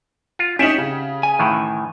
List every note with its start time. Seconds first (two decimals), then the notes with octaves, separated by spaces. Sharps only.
0.39 F4
0.59 C#4 D#4 G4 E5 F#5
0.78 C#3
1.23 G#5
1.39 A2 D#3 E3